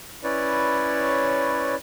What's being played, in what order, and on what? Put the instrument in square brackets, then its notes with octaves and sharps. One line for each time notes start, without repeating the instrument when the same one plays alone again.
[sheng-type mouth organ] C#4 E4 B4 C#5 D5